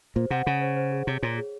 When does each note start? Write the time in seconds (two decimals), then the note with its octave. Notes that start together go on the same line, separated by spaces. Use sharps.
0.16 A#2 C5
0.30 C3 F#5
0.46 C#3 F#5
0.61 C5
0.77 C5
0.91 G#4
1.07 C3 C#5
1.23 A#2 C#5
1.38 G#4